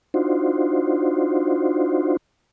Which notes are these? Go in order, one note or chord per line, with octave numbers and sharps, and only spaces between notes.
D4 D#4 F4 F#4 C5